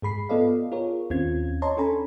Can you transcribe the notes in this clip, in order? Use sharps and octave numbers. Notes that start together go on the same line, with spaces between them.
G#2 G#4 B5 C7
B3 F4 A4 D5 D#5 F5
F4 G#4 A#4 C#5
D#2 C4 C#4 F4 G#6
C#5 D#5 A5 A#5 C6
C#4 D4 A4 G#5 A#5 B5